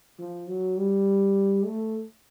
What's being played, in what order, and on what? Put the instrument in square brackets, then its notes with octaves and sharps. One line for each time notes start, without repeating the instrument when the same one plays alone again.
[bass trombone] F3
F#3
G3
A3